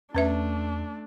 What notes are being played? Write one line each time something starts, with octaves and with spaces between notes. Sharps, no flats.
E2 A3 C#4 D4 B4 E5